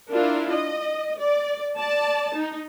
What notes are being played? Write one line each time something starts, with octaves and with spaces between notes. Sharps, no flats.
D4 E4 F4 A#4
D#5
D5
D5 A5
D#4